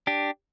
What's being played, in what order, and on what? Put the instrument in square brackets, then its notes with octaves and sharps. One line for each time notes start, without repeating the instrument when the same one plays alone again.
[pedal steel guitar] D4 G4